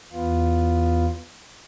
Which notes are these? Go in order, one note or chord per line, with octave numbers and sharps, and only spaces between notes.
E2 B3 F4